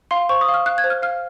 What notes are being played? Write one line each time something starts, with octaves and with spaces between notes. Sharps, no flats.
F5 C6
C5 C#6
D#6
F5
F6
F5 F#6
G#6
C5
F6
F5 F6